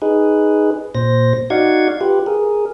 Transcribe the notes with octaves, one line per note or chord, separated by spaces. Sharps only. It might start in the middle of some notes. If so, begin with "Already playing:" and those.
D#4 G#4 B4
A#2 C5 A#6
D#4 F#4 D5 F5 F#5 G#6
F4 G4 B4
G#4 A#4